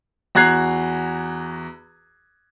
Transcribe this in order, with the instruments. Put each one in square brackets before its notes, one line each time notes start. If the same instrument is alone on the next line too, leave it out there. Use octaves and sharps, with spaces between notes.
[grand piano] E2 F#4 A#5 F#6 G#6 C7